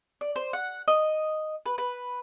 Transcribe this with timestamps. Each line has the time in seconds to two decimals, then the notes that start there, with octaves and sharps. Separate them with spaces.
0.21 D5
0.36 C5
0.53 F#5
0.88 D#5
1.66 B4
1.78 B4